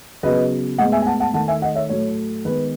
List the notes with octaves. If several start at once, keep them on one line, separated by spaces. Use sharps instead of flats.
C#3 F#3 B3 B4 D#5
A2 G#3 B3 D#5 F#5
E5 G#5
G#5
F#5 A5
F#5 A5
D#3 A3 F#5 A5
E5 G#5
D#5 F#5
C#5 E5
A2 F#3 A3 C#5
D#3 G#3 B3 B4